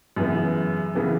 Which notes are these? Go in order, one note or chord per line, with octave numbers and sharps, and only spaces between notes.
F#2 C#3 E3 B3
C#3 E3 B3